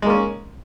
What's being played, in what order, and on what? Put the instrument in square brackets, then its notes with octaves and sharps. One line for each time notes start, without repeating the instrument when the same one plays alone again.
[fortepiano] G#3
A#3
C#4